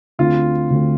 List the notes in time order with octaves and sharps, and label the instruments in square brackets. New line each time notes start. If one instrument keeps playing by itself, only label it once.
[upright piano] D2 D3 A3 C4 [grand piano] F4
[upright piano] D2 D3 A3 C4